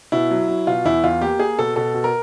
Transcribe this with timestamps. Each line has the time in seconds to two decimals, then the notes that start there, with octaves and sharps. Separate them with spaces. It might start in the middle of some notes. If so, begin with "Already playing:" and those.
0.12 B2 E4
0.31 F#3
0.48 F#3
0.67 B2 F4
0.85 E2 E4
1.03 E2 F4
1.21 A#3 G4
1.39 A#3 G#4
1.59 B2 A4
1.76 B2 A4
1.94 B2
2.04 A#4